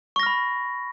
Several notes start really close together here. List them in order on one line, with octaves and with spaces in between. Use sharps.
C#6 A#6 F6 B5